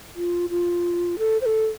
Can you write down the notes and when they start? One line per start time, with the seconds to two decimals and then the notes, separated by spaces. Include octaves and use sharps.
0.16 F4
0.50 F4
1.19 A4
1.41 C5
1.46 A4